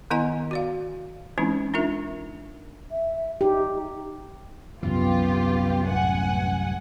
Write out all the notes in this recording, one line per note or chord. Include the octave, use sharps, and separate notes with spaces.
D#3 B3 E4 D#5 G#5 A#5
F#4 D5 F5
E3 G#3 C4 C#4 D#4 E4
D4 D#4 F4 A#4 E5
E5
D#4 G4
C2 F#2 E3 B3 F4 G4
A1 F#5 G#5